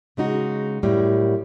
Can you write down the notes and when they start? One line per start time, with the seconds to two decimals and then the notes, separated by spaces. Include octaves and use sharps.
0.17 C#3 G#3 D#4 F#4
0.83 F#2 A2 G3